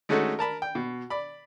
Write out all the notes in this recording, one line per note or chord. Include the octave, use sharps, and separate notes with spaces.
G#3 A3 C#4 D#4 F#4 A4
A#4 A5 B5
G5
B2
D5 B5